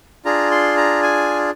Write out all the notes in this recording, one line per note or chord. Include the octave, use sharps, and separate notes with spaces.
D4 F4 G#4 A#5
C6
A#5
G#5